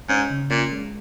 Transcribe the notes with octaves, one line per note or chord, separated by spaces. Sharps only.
G#2 C#4
C#3
A#2 C#4
G#3